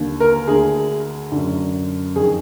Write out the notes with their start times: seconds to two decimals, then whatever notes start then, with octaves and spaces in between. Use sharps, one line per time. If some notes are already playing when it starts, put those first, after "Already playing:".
Already playing: D#2 D3
0.20 A#4
0.48 D2 D3 G#4
1.32 F#2 D3
2.16 F2 D#3 G#4